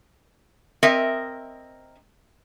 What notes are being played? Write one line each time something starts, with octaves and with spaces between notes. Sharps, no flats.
C4 A#4 D#5 E5